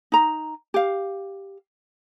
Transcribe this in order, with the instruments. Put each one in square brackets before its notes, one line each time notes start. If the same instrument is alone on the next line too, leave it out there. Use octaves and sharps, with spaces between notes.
[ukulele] D#4 A#5
G4 F5